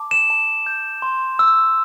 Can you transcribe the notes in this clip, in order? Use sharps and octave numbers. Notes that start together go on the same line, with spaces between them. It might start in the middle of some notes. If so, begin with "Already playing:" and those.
Already playing: A5 D6
E7
A5
G6
C6
E6